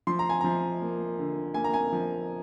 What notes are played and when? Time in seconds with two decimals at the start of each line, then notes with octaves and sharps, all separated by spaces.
0.07 F3 C6
0.19 A#5
0.30 G#5
0.41 F3 A#5
0.82 A#3
1.19 D3
1.54 A#3 G#5
1.64 A#5
1.74 G#5
1.92 F3